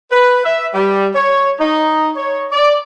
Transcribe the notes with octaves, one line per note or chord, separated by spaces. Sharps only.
B4
E5
G3
C#5
D#4
C#5
D5